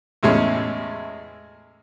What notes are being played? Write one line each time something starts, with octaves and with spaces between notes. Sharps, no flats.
E2 A2 G#3 C#4